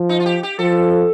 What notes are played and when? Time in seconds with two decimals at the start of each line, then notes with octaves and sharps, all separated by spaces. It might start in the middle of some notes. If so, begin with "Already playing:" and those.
Already playing: F3
0.09 D#4
0.20 F4
0.26 G4
0.43 G4
0.59 F3 A4